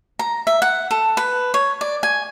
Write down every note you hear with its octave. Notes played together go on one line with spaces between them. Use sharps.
A#5
E5
F#5
A4
B4
C#5
D5
G#5